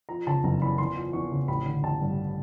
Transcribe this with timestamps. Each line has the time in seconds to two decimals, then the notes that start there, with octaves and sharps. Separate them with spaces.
0.09 F3 A#5
0.27 C#3 A5
0.44 F#1 A#5
0.61 E2 B5
0.78 E2 C6
0.96 F3
1.13 E2 C#6
1.31 C#3
1.48 A1 B5
1.65 D3
1.83 A1 A5
2.02 G2